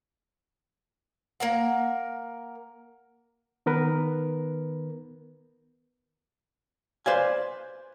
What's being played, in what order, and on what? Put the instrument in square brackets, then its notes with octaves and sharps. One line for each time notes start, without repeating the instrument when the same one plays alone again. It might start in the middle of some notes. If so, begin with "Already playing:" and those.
[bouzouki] A#3 A#4 F#5
[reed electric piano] D#3 B3 A#4 B4
[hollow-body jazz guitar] B4 C5 D5 F5 G#5